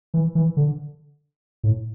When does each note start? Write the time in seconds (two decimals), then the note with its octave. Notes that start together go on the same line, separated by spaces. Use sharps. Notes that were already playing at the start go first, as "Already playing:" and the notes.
0.14 E3
0.35 E3
0.57 D3
1.64 A2